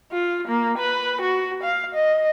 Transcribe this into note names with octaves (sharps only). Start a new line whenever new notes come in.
F4
A#3
B4
F#4
F5
D#5